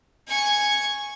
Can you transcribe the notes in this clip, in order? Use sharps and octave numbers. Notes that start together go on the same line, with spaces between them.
G#5 C#6